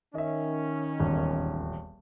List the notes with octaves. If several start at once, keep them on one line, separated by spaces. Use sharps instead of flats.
D#3 C#4 D#5 E5
D#1 G#1 E2